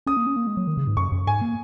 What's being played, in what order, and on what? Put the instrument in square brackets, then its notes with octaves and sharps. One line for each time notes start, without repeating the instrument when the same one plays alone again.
[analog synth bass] C#4 [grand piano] D#6
[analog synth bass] A#3
C#4
A#3
G#3
F#3
D#3
C#3
G#2
[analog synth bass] F#2 [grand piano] C#6
[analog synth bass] F#2
[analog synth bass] G#2 [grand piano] G#5
[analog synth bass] A#3